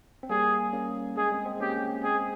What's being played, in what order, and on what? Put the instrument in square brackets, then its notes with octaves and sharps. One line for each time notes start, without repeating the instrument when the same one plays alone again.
[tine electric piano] C4
[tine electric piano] G3 A#3 [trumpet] G#4
[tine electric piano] A#3 C#4
[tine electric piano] G#3 [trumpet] G#4
[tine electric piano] G#3 C4
G#3 C4
[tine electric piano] A#3 C#4 [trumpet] G4
[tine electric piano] G#3 C4 [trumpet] G#4